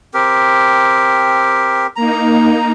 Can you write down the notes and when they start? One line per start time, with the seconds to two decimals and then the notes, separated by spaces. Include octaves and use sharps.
0.14 C4 G4 A#4
1.96 A#3 D#4 A#5